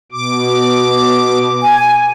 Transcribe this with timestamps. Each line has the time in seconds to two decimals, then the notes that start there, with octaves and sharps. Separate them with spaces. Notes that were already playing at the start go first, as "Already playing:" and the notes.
0.12 B2 D6
1.62 G#5